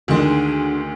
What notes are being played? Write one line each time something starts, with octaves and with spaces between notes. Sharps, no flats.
D2 D#3 G#3 D4 G#4